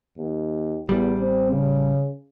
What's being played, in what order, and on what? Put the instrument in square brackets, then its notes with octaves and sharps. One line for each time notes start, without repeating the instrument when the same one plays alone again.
[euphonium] D#2
[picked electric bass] A1 G3 [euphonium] E2
[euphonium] C4
C#3